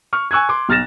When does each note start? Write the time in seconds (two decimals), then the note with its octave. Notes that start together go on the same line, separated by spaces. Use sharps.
0.13 C#6 F6
0.31 G#5 C#6 E6 F#6 G#6
0.49 C6 D6
0.69 B1 F6 A6 A#6 E7